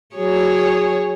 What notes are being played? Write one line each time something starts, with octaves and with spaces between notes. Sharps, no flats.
F#3 G#4 C#5